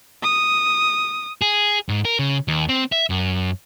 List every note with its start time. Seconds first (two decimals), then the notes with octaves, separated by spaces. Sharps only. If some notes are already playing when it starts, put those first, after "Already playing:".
0.23 D#6
1.42 G#4
1.89 G#2
2.05 A#4
2.19 C#3
2.48 D#2
2.69 C4
2.92 E5
3.10 F#2